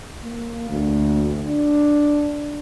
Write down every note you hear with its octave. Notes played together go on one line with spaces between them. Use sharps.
A#3
D2
D4